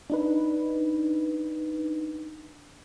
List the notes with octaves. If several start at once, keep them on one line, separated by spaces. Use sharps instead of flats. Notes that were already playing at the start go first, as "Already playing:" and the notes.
D4 D#4 B4